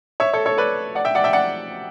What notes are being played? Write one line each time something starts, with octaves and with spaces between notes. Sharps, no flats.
C#5 E5
A4 C#5
A4 C#5
B4 D5
D5 F#5
E5 G5
D5 F#5
E5 G5
D5 F#5